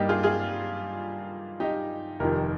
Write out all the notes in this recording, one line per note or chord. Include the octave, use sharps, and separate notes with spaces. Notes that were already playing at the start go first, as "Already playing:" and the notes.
Already playing: G2 G3 A#3 D#4 G4
F4 G#4
F4 G#4
D#4 G4
F1 F2 D#3 G4 A#4